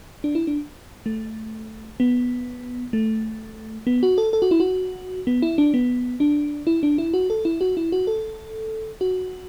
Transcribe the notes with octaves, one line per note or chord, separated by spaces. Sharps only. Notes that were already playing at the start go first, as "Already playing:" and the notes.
D4
E4
D4
A3
B3
A3
B3
F#4
A4
A4
F#4
E4
F#4
B3
E4
D4
B3
D4
E4
D4
E4
F#4
A4
E4
F#4
E4
F#4
A4
F#4